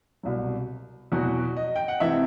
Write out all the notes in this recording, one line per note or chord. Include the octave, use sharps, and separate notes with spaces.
C2 B2 F#3
E2 B2 F#3 F#4
D#5
G5
F#5
C3 E3 E5